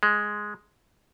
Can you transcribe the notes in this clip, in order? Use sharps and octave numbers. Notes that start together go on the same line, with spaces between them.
G#3